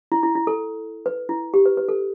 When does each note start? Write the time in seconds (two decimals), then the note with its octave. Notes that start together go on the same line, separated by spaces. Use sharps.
0.12 E4
0.23 E4
0.35 E4
0.47 A4
1.06 B4
1.29 E4
1.54 G4
1.65 B4
1.77 B4
1.88 A4